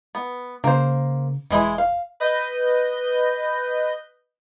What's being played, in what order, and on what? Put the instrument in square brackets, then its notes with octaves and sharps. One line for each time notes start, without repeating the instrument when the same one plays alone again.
[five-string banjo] B3
[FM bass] C#3 [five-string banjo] A#3 C5
[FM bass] E1 [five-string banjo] E3 G#3 E4
[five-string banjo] F5
[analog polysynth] B4 D#5 G6